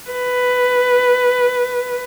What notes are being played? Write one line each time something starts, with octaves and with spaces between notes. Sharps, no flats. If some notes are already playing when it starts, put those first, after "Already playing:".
B4